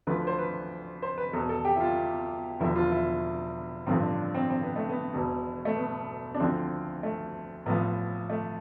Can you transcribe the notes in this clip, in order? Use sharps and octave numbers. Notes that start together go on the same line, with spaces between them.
D2 D3 F3 B4
C5
B4
C5
B4
E2 B2 A4
A4
G4
E4
F4
E1 E2 D3 F3 E4
F4
E4
A1 G2 D3 F3 C4
D4
C4
C4
B3
A3
B3
E1 E2 B2
A3
B3
D4
D2 D3 F3 C4
A3
A1 A2 F3 B3
A3